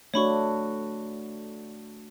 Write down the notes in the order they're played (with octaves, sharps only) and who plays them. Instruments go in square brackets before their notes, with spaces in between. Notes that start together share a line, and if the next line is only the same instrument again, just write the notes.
[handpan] A3 D4 F#4 [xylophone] C#5 B5 C#6